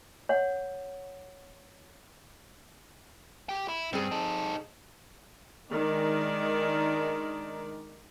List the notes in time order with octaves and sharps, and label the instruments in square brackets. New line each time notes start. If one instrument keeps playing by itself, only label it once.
[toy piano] C#5 F#5
[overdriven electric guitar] G4 G5
E4
[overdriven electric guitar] G2 [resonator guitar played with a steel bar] C4 G#4
[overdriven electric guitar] D#4 A4
[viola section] D#3 G#3 D4 A#4 D5